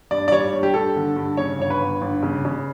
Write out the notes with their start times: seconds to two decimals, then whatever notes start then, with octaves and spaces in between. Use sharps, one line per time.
0.11 G2 D5
0.28 D5
0.31 G3 C#5
0.52 G2
0.63 G4
0.74 G2 A4
0.96 D3
1.16 G2
1.37 C#3 C#5
1.59 G1 C#5
1.70 B4
1.81 G1
2.01 G1
2.23 C#3
2.45 C#3